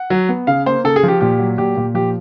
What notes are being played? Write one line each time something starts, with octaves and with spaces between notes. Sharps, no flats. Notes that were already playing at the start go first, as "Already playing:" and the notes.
Already playing: F#5
F#3
B3
C#3 F5
A#3 C5
C#3 A4
G#4
F3 G4
A#2 G4
F#3
A#2 G4
A#2
F3 G4